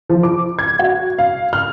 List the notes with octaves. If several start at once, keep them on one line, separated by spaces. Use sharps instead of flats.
F3
D6
G#6
F#4
F5
F6